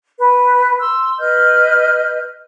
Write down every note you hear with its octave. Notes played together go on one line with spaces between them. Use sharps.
B4
C6 E6
B4 D#5 F6 G6